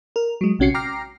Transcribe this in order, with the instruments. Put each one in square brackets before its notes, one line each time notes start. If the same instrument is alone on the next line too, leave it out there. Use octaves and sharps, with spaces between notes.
[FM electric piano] A#4
F#3 G#3
A#1 C3 C#4 F#4 C7 C#7
G5 A#5 D6 F6 A#6 C7